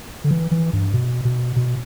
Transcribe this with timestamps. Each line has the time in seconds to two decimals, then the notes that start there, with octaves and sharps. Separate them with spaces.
0.24 D3
0.31 E3
0.51 E3
0.73 G2
0.93 B2
1.25 B2
1.56 B2